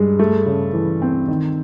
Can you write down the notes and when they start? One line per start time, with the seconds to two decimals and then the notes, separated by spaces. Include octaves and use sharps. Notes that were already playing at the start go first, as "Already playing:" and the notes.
Already playing: G2 G#3
0.19 A3
0.46 C#3
0.73 E3
1.02 C4
1.28 D#3